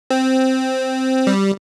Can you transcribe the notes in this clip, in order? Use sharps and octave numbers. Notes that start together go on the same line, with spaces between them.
C4
G3